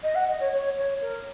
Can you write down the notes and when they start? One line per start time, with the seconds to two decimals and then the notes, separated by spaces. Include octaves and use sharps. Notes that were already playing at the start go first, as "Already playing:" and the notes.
0.03 D#5
0.15 F#5
0.28 D#5
0.40 C#5
0.52 C#5
0.77 C#5
1.01 A#4